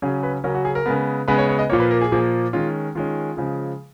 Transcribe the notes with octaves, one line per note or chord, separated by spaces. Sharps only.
C#3 F#3 C#4 G#4
B4
C#3 F#3 C#4 A#4
F#4
G#4
A#4
C#3 G#3 B3
C#3 G#3 B3 B4
C#5
C#5
D#5
A#2 F3 A#3 C#5
B4
A#4
G#4
A#2 F3 A#3
D#3 G#3 C#4 F4
D#3 G#3 C#4 F4
C#3 F3 G#3